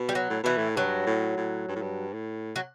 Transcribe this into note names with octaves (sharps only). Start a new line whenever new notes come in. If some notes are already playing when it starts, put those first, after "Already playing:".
Already playing: B2
G3
F#3
A2
B2 E3
A2
G2 F#3
A2
A2
G2
A2
G2
A2
F#3